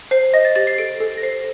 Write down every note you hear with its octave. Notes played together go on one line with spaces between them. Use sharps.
C5 C7
D#5 A#6
A6
G4 A6
C7
A4 D7
A4
A#6
C5 C7